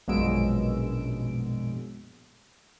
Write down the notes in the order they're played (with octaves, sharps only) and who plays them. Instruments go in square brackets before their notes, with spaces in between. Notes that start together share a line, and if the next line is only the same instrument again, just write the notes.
[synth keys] A#1 F#2 B2 G#3 E6 D7